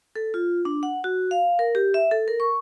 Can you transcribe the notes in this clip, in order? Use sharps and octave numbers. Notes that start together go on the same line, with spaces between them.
A4
F4
D4
F#5
F#4
F5
A#4
G4
E5
A4
A#4
C#6